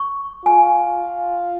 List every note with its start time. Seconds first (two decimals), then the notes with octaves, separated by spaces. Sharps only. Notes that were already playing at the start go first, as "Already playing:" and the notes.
Already playing: C#6
0.45 F4 G#5